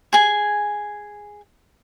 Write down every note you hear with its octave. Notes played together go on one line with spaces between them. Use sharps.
G#4 G#5